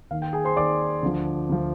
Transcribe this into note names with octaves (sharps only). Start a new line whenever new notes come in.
D#2 D#3 F5
G5
G#4 G#5
C5 C6
D#2 D#3 D5 D6
D2 D3 F3
D2 D3 F3